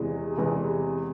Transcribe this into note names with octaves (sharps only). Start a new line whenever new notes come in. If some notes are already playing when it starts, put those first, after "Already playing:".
Already playing: E2 C3 E3 G#3
E2 C3 E3 G#3